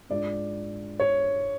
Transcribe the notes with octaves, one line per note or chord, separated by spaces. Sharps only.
G#2 G#3 D4 F4 D5
C#5